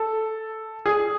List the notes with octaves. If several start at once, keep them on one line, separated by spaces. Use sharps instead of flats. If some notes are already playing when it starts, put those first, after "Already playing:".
Already playing: A4
G#4